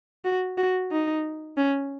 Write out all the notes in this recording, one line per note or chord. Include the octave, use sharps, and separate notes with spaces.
F#4
F#4
D#4
C#4